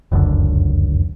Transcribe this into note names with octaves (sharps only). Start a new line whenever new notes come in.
F1 C#2 F#2 D3